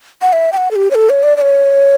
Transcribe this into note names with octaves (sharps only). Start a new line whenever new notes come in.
F#5
E5
G5
F#5
A4
G4
C#5
A4
C#5
D5
D5
C#5